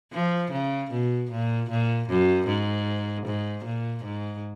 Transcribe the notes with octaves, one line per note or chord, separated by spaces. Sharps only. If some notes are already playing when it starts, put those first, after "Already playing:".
F3
C#3
B2
A#2
A#2
F#2
G#2
G#2
A#2
G#2